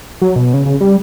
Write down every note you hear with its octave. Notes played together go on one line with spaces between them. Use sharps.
F#3
B2
C#3
C#3
G3